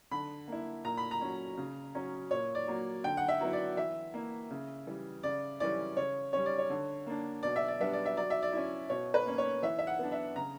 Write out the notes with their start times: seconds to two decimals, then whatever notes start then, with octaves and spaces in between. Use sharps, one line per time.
0.11 D3 B5
0.48 A#3 E4
0.85 A#2 A#5
0.97 B5
1.11 A#5
1.21 F#3 C#4
1.57 C#3
1.95 F#3 C#4
2.31 A#2 C#5
2.55 D5
2.68 F#3 A#3
3.04 D3 G5
3.17 F#5
3.28 E5
3.41 F#3 B3 E4
3.53 D5
3.77 E3 E5
4.14 A#3 E4
4.51 C#3
4.87 E3 G3
5.23 C#3 D5
5.60 E3 G3 C#4 E4 D5
5.97 C#3 C#5
6.33 G3 C#4 C#5
6.46 D5
6.58 C#5
6.70 D3
7.06 A#3 D4
7.43 B2 D5
7.56 E5
7.68 D5
7.80 G3 B3 D4 E5
7.93 D5
8.06 E5
8.17 F#3 D5
8.30 E5
8.43 D5
8.53 C#4 E4
8.90 B2 C#5
9.14 B4
9.26 A#3 C#4
9.38 C#5
9.63 E3 E5
9.79 E5
9.87 F#5
9.99 B3 D4
10.12 E5
10.36 C#3 A#5